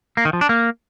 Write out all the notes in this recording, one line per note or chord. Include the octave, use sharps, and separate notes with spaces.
A#3
D#3
F3
D4
A#3